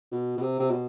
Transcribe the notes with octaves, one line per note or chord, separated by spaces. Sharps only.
B2
B2
C3
C3
B2